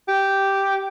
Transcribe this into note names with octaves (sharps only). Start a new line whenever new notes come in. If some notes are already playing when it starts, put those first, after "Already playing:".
G4